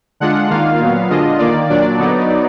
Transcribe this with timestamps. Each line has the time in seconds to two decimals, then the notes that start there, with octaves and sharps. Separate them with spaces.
0.20 D3 G#3 D4 F4 F#5
0.50 D#3 A#3 F4 F5
0.80 A#2 F#3 B3
1.10 D3 G#3 D4 F4 D#5
1.39 D#3 A#3 F4 D5
1.69 A#2 F#3 D4 D5
1.98 D3 F#3 B3 D#4